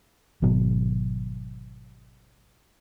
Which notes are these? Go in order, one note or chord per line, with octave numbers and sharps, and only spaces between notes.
G#1 B2 F#3